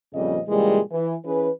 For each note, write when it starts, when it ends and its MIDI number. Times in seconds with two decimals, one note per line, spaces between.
0.14 0.39 41
0.14 0.39 46
0.14 0.39 49
0.14 0.39 53
0.14 0.39 55
0.14 0.39 75
0.48 0.79 46
0.48 0.79 49
0.48 0.79 52
0.48 0.79 55
0.48 0.79 56
0.91 1.14 52
1.25 1.50 52
1.25 1.50 61
1.25 1.50 68
1.25 1.50 71